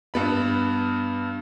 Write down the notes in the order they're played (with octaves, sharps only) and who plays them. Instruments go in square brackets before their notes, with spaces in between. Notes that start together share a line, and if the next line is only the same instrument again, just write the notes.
[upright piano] G2 B3 B5